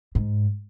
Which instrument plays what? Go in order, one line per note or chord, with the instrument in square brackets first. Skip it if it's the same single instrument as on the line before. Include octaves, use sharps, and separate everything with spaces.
[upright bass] G#2